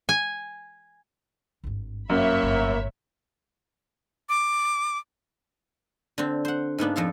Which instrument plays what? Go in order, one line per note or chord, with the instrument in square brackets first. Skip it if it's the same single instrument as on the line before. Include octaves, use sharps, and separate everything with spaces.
[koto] G#5
[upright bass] G#1 G2
[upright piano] F#2 [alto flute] A#3 [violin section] C#5 E5 B5
[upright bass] G1 A2
[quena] D6
[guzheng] D3 C4
C5 F#5
G#2 A#3 B3 D4
F2 F3 A4 F5